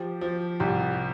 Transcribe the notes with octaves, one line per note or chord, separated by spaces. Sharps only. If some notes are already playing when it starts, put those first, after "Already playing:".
Already playing: F3 G4
F3
C2 G4